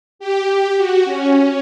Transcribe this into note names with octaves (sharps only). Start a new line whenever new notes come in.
G4
F#4
C#4